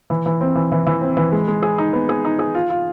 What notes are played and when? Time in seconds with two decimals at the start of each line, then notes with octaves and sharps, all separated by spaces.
0.10 E3
0.26 E3
0.41 C4
0.55 E3
0.72 E3
0.87 E3
1.01 C4
1.17 E3
1.32 G#3
1.48 G#3
1.63 G#4
1.78 D#4
1.93 B3
2.09 G#4
2.25 D#4
2.39 G#4
2.55 F4
2.70 F4